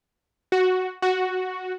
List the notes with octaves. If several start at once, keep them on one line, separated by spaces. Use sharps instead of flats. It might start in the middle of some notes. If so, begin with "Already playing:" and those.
F#4
F#4